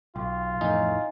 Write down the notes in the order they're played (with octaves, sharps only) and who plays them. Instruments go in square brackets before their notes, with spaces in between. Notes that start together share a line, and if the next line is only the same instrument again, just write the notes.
[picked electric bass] B1 [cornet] F4 [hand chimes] G5
[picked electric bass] A1 F2 A2 [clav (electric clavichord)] D#4 [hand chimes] E4 G#5